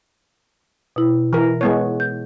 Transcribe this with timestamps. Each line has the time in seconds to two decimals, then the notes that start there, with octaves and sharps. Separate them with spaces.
0.96 B2 E4
1.33 E3 A#4
1.61 G#3 B3 C#5
2.00 G6